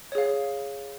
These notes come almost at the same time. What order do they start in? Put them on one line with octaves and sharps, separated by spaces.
C#5 G#4 F5